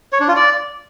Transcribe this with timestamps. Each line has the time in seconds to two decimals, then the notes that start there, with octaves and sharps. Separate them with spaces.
0.13 C#5
0.20 D4
0.28 F4
0.36 D5